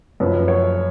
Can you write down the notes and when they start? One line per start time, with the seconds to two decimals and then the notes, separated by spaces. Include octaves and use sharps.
0.20 F#2 F3 B4
0.48 C#5